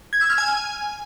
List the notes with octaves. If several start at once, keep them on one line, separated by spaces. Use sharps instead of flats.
G#6
E6
F6
G#5